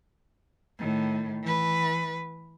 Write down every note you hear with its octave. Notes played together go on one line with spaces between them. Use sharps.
A2 D#3
E3 B4